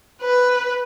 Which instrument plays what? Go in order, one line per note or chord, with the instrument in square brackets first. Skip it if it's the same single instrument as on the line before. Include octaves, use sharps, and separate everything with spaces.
[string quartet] B4